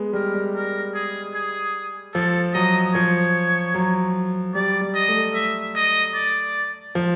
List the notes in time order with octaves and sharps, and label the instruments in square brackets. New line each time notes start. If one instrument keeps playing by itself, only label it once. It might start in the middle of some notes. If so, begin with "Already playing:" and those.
Already playing: [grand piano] G#3 B3
[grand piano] G3 [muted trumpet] A#4
[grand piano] G3
[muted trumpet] A#4
G#4
G#4
[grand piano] F3 [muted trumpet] A4
[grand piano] F#3 [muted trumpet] D#5
[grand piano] F3 [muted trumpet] C#5
[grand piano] F#3
[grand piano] G3 [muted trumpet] D5
[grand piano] G3
[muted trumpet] D#5
[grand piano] A3
[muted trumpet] E5
D#5
D5
[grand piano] F3